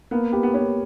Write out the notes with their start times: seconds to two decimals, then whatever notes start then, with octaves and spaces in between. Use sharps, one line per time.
0.11 A#3 B3
0.32 B3 G4
0.43 B3
0.54 B3 C#5